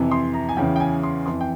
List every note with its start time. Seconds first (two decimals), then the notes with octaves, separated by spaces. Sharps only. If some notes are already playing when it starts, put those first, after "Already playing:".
Already playing: F2 C3 E3
0.11 C6
0.34 A#5
0.49 G#5
0.57 E2 C#3 E3 G5
0.76 G5
0.80 G#5
1.03 C6
1.26 F2 E3 C6
1.41 G5